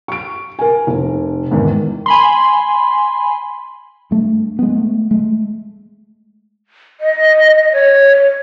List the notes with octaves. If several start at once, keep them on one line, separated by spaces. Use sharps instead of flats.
C#6 D7
A#4 G#5
F1
E2 G#2 D#3
G#5 B5 C6
G2 A3
G#3 B3
A3
G#3 A3
D#5
C#5